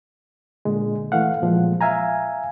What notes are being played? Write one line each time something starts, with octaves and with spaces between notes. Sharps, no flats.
A#2 D3 G#3
E3 A3 F5 F#5
A#2 F3 G#3
E5 F5 G#5 A#5